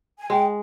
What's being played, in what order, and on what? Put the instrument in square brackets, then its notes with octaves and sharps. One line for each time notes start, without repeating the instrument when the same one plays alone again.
[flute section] G#5
[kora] G#3 [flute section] G5